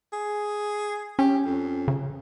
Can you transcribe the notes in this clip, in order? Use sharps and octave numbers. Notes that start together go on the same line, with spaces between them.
G#4
C#4 G4
F2
C#3